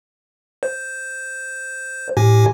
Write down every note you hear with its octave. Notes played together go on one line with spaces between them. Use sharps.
C5
A2 G4 G#5